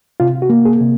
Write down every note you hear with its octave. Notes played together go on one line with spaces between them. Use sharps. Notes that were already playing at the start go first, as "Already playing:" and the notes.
C3 F4
F#4
A#3
G#4
C3